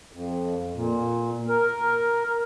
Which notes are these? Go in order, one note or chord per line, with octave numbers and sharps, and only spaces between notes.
F2
A#2
A#4